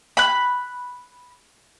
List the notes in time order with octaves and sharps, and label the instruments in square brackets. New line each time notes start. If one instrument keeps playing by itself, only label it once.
[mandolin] B5 F#6